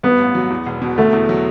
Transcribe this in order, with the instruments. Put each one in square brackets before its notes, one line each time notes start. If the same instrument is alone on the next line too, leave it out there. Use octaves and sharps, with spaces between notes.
[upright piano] G2 [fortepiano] B3
[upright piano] A1
F#3
E2
E1
B2
[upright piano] D3 [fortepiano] A3
[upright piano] E2
F#3